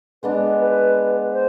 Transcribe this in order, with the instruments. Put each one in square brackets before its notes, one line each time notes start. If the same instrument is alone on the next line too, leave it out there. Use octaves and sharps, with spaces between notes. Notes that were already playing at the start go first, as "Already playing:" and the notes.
[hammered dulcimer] G#3 B3 D4 [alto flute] B4
[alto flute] B4
B4
C5